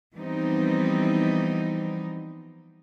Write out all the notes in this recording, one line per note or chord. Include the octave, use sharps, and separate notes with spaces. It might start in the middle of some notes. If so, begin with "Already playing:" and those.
E3 F3 G3 B3 C4 D#4